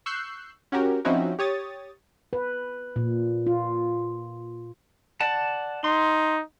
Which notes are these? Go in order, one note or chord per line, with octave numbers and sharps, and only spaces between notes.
C#6 E6 F#6 G6 C7
C#4 F#4 G4 A#4
F3 C4 C#4 D#4 E4 F#4
G4 C#5 D#6 A6
B4
A#2
F4
D5 F#5 A5
D#4 C6